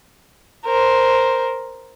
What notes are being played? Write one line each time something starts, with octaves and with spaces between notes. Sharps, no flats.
A#4 C5